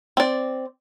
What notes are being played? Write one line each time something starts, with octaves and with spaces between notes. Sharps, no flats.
C4 D5